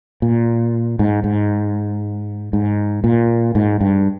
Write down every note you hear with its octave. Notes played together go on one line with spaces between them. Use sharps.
A#2
G#2
G#2
G#2
A#2
G#2
G2